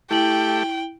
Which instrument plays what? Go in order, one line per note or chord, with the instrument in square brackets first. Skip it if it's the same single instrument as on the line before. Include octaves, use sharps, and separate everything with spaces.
[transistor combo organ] A3 G4 [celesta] E4 F#7 [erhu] G5